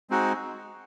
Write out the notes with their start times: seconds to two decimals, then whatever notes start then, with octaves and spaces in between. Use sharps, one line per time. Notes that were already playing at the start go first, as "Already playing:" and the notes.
0.10 G#3 C4 D#4 F#4